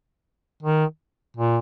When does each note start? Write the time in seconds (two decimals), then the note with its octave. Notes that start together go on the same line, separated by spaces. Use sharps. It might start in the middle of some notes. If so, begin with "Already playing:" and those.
0.63 D#3
1.37 A#2